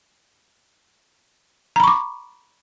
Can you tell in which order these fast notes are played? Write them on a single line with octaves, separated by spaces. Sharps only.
A#5 B5 C#6 D6